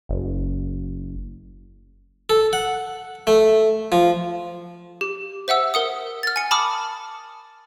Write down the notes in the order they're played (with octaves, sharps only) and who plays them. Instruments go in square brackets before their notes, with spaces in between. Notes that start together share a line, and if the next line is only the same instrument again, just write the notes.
[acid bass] F#1
[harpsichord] A4
F#5
A3
F3
[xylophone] G4
C5 E5 F#5 E6
A#4 F#5 D#6
F6 A6
G#5 C#7
A5 B5 D6 D#6 F6